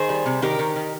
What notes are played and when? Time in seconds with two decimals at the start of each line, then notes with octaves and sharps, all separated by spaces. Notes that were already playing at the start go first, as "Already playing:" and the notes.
Already playing: D#3 G#4 C5
0.09 G3
0.26 C3
0.42 D#3 G4 A#4
0.59 D#3
0.76 D#3